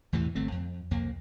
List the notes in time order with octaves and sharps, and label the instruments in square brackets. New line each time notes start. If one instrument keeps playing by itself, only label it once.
[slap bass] E2 A2 C3 E3
G1 A3 C4
F2
C2 F2 A#3